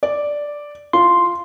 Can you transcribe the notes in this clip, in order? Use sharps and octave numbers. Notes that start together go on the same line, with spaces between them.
D5
F4 C6